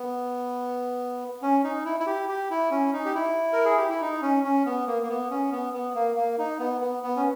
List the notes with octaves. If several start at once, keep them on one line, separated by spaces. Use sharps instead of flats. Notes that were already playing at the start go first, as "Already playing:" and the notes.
Already playing: B3
C#4
D#4
E4
E4
G4
G4
E4
C#4
D#4
G4
E4
A#4
G#4
G4
E4
D#4
C#4
C#4
B3
A#3
A#3
B3
C#4
B3
B3
A#3
A#3
D#4
B3
B3
B3
C#4